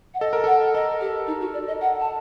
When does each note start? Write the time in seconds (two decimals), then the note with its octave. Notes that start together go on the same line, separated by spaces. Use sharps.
0.14 F#5
0.20 A4 D#5
0.33 A#4
0.44 A4 F#5
0.74 A4 D#5
1.00 G4
1.27 D#4
1.41 F#4
1.53 D5
1.67 D#5
1.81 F#5
2.00 A5